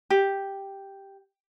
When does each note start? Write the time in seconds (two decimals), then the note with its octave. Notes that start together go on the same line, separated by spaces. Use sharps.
0.10 G4